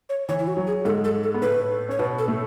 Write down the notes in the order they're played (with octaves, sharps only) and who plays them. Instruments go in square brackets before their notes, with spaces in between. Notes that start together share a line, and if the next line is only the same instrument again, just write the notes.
[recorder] C#5
[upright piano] E3 [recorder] C#5
[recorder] E4
F#4
[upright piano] F#3
[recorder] G#4
[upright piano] G#2 G#3 [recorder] A4
[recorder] A4
A4
[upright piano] B3
[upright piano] A2 A3 [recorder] B4
[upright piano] C#4 [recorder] C#5
[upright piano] B2 B3 [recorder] B4
[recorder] A4
[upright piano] A2 A3